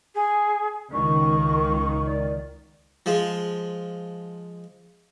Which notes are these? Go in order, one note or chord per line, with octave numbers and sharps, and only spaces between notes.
G#4
C#2 D#3 C#6
D5
F3 G#3